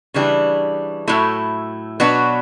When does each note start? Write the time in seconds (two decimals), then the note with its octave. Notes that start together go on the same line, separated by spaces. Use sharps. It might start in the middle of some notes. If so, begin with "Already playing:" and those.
0.14 C#3 E3 G3 D4
1.08 A2 F#3 A3 E4
2.00 B2 F#3 B3 D4 F#4